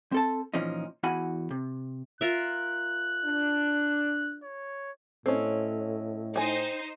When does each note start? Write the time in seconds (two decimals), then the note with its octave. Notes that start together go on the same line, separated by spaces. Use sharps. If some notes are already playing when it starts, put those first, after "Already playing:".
0.12 C4 A4 A5
0.54 A#2 E3 F3 C#4 D#4
1.03 E2 E4 F#4 F#5 G#5 B5
1.51 C3
2.21 F4 A#4 E5 F#6
3.25 D4
4.43 C#5
5.26 A2 C4 C#4 A4 C#5 D#5
6.36 D#4 C5 G5 G#5